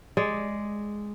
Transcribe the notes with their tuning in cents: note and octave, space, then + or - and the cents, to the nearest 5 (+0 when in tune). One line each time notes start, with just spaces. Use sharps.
G#3 +0 D5 +0